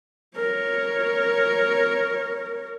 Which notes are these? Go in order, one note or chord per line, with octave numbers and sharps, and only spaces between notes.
A#4 C#5